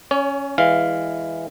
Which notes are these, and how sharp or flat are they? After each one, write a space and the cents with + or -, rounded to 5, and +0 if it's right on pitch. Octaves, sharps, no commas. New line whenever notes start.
C#4 +0 C#5 +35
E3 +0 G#3 -15 F5 +0